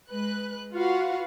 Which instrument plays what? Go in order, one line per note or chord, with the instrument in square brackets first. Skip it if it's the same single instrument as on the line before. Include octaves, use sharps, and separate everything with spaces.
[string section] G#3 B4 F#6
F4 F#4 B4 F5 F#5